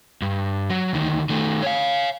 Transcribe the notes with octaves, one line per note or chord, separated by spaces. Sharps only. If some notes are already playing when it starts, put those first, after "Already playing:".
G2
F#3
D2 D#3
D#3 A3
C#5 F5